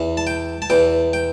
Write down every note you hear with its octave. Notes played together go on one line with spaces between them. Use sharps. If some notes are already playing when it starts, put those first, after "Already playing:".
Already playing: E2 E3
A5
G5
A5
E2 E3 G5
G5